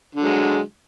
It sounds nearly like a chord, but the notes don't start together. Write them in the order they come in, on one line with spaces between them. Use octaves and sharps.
D3 F#3 G#3